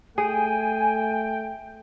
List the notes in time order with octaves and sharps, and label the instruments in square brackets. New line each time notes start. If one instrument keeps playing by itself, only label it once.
[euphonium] A3 [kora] G#4 [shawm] G5 [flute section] G#5